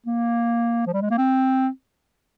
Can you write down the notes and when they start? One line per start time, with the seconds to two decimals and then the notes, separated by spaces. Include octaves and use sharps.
0.06 A#3
0.87 F3
0.93 G3
1.02 G#3
1.11 A#3
1.18 C4